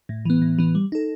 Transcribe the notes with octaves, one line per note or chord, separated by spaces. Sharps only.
A2
E3 B3
A2
E3 B3
G3
D#4 A4